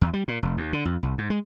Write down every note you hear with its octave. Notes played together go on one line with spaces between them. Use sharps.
E2
G3
A#2
F1
D#2
D3
F2
C2
G#2
G#3